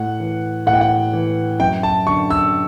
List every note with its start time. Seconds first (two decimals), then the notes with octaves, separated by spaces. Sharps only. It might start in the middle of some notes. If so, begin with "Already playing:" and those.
Already playing: A2 F#5
0.20 E3
0.66 A2 F#5
0.73 G5
0.81 F#5
1.13 E3
1.59 F#2 G5
1.83 A5
2.07 D3 C#6
2.30 E6